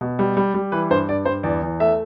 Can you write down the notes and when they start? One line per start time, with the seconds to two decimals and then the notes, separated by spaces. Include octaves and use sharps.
0.01 B2
0.19 G3
0.37 G3
0.54 G3
0.72 E3 B4
0.90 G2 C5
1.09 G2 D5
1.25 G2 C5
1.43 E2 D5
1.62 E2
1.80 A3 E5